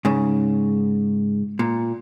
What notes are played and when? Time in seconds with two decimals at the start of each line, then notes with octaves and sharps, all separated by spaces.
0.05 G#2 C#3
1.59 A#2